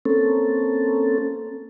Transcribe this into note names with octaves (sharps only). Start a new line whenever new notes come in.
A#3 C4 C#4 A4